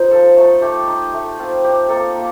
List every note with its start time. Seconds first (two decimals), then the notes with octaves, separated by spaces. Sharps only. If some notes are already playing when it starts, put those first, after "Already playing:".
Already playing: D#4 F4 C5
0.11 F3 A4
0.37 A3 D#4
0.61 A3 G4
0.87 D#4
1.13 A3
1.39 C4 F4
1.64 G3 G4
1.89 A#3 D#4 A4
2.15 A#3